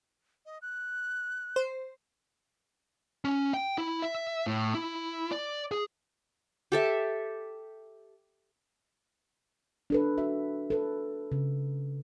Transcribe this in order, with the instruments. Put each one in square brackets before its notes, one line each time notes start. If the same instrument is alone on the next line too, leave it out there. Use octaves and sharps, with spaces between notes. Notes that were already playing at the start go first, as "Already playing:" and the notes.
[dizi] D#5
F#6
[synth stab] C5
[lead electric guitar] C#4
G5
E4
E5
A2
E4
D5
G#4
[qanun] G4 A4 E5
[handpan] D4 A4 B4
F#4 E5
A4 B4
C#3